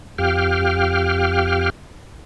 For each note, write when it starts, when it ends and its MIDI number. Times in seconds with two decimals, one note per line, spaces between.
0.18 1.70 41
0.18 1.70 67
0.18 1.70 77
0.18 1.70 79
0.18 1.70 89